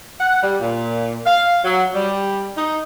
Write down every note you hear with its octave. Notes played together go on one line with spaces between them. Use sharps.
F#5
G3
A#2
F5
F#3
G3
D#4